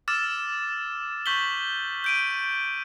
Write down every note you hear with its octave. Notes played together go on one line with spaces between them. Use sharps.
D6 E6 F6 A6 E7
C#6 G6 B6 F#7 G7
G6 D7 D#7